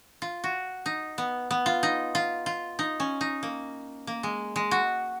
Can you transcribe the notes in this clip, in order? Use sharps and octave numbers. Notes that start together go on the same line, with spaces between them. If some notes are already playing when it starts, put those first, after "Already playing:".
F4
F#4
D#4
B3
B3
F4
D#4
F4
F4
D#4
C#4
D#4
A#3
A#3
G#3
G#3
F#4